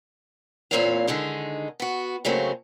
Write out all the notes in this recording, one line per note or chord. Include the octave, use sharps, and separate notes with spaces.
E2 A#2 A#3 C4 C#5 F5
D3 D#3 G#3 D#4
B3 F#4
F#2 C#3 F#3 A3 A#3 C4